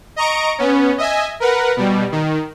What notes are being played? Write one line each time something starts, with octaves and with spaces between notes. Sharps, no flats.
D#5 A#5 C#6 D7
B3 C#4
D#5 E5 G#5
A#4 B4 F#5
B2 G3
D#3